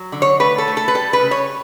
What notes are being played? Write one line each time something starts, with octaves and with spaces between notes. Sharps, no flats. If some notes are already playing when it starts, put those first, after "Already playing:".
Already playing: F#3
D3
C#5
A3 B4
A4
A3
A4
B4
G3 A4
B4
C#3
C#5